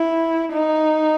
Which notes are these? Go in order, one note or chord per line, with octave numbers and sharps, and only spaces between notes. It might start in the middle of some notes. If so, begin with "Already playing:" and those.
Already playing: E4
D#4